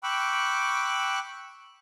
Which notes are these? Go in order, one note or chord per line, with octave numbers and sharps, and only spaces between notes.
G5 B5 C#6 D6 E6 F#6